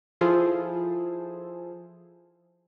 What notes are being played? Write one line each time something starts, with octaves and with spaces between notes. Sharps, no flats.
F3 E4 F4 G#4 A4 C5